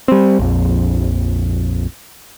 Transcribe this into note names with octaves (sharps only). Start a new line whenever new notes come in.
G3 C4
A#1 F2